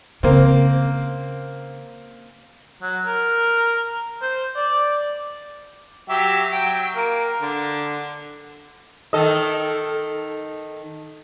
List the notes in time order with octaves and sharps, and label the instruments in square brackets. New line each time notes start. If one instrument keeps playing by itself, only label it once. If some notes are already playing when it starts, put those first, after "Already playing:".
[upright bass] C#3 [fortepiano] A#3 C4
[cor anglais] F#3
A#4
C5
D5
[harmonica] F#3 G4 E5
F#3 G5
A#3 A#4
D3
[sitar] D#3 A4 D#5